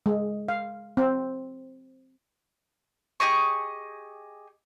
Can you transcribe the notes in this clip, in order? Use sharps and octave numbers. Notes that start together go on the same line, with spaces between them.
G#3
F5
C4
G4 G#4 D#5 C#6